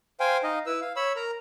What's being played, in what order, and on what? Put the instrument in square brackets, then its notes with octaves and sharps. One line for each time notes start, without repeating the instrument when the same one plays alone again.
[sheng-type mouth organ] C5 F5 G5 G#5
D#4 D#5 F5
E4 B4 E6
F5
C#5 B5 E6
A#4 A#5